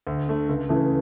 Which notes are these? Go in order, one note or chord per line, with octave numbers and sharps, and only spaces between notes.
D2
D3 A3
C#2
C#3 E3 A3